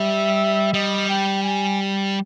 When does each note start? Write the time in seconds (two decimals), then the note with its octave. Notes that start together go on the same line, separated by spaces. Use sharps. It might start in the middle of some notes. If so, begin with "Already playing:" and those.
Already playing: G3 E5
0.73 G3 D#5
1.09 G5
1.42 G#5